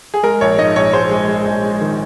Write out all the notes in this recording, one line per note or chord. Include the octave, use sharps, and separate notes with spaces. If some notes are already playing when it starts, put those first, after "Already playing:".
G#4
G#3 A#4
A#1 C#5
G#2 D#5
A#1 C#5
G#3 C5
G#3
G#3
A#1
G#3
D#3